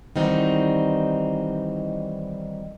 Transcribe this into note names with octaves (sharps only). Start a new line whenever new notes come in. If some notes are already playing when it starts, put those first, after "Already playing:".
D#3 E3 G3 C4 D#4 F#4